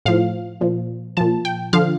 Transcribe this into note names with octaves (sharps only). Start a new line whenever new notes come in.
A2 F3 F5
A#2 F3
A#2 F3 A5
G5
D3 F3 F5